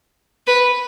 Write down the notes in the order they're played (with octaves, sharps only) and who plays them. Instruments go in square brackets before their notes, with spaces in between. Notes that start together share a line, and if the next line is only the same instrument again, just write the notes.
[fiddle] B4